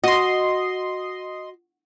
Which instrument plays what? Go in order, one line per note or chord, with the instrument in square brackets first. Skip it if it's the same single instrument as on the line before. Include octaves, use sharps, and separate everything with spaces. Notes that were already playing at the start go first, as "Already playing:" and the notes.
[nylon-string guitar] F#4 [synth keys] D#5 C6